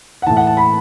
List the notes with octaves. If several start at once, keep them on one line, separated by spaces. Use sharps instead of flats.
F#5
A2 E3 A5
F#5
A5
B5